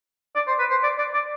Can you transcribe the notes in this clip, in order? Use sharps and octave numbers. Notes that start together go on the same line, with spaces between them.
D5
C5
B4
C5
D5
D5
D5